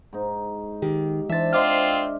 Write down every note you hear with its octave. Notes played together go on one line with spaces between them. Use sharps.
G#2 D#4
D#3 G4
E3 D4 C5 E5 A6
C4 F4 D#5 D6 F6